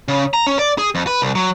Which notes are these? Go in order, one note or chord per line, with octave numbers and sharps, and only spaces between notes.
C#3
A#5
C#4
D5
G#4
F2
B4
C2
F#3